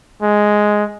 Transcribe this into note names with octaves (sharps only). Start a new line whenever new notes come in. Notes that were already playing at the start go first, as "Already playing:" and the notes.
G#3